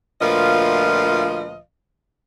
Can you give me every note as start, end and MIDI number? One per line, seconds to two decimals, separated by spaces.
0.21 1.59 38
0.21 1.59 46
0.21 1.59 53
0.21 1.59 71
0.21 1.59 75
0.21 1.59 77